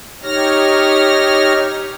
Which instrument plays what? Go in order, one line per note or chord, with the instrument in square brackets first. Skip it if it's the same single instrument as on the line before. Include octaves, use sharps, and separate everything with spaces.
[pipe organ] D#4 G4 C#5 F6 A#6